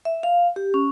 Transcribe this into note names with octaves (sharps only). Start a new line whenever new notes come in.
E5
F5
G4
C#4